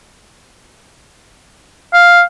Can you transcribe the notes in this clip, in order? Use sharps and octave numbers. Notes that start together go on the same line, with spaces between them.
F5